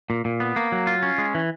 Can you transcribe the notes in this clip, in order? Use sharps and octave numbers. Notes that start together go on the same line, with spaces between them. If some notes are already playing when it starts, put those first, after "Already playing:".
A#2
A#2
B3
A#3
F#3
F4
C#4
G#3
E3